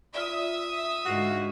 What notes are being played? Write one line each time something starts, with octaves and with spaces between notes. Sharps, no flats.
F4 D5 E5 D#6
G#2 D3 F#4 F5